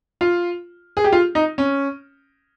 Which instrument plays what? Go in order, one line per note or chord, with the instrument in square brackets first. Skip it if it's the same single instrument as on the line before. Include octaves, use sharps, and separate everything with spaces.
[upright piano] F4
G#4
G4
F4
D#4
C#4